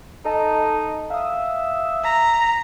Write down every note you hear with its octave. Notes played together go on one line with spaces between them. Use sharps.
D#4 A4 D#5 A5
E5 F5 D#6
A#5 B6